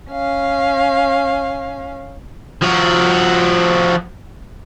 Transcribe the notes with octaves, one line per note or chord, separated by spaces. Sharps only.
C#4 F5
F3 F#4